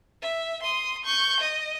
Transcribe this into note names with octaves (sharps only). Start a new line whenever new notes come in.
E5
C6 D#6
C#6 G6
D#5